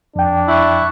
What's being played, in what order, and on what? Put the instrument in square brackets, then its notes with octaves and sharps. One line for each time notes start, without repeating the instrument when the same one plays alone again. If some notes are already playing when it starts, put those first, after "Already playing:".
[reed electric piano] F2 G5 [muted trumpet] D4
[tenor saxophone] E4 [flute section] E5 C#6 F#6